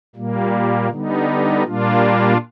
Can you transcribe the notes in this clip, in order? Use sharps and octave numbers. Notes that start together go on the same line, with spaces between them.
A#2 G3 A#3
D3 G3 B3 D#4
A#2 G3 A#3 D4 F4